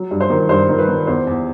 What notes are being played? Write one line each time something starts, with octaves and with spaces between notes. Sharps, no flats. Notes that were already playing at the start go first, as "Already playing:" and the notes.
Already playing: F#3
G2
C5
D#3
G2 C5
D#3
B4
D#3
E2 C5
E2